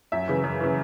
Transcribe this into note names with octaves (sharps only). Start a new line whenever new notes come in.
F#2 E5
C#3 E3
F#2
C#3 E3